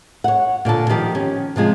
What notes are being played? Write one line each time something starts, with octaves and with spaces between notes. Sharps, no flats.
C#5 F#5
A#2 D3 A4 A5
D#3 F3 G4
C#4
C3 F3 G#3 F4